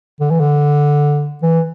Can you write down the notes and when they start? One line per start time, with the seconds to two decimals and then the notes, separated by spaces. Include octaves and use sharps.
0.21 D3
0.31 E3
0.40 D3
1.43 E3